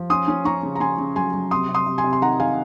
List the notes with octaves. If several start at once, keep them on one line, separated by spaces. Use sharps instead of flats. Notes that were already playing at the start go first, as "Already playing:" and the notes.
Already playing: F3
C#4 C6 D#6
C#4
C#4 A#5 C#6
C#3
A#5
C#3 G#5 C6
C#3
F#3 G#5 C6
F#3
C3 C6 D#6
C3
C6 D#6
C3
G#5 C6
C3
C6
D#3 F#5 A#5
D#3 F5 G#5